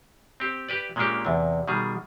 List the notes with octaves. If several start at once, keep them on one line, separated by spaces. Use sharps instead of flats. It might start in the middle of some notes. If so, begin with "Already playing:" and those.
C4 G4
G4 B4 D5
A#2 G#3 A#3 C#4 D4 G4
E2 C3
B2 D#3 G3 G#4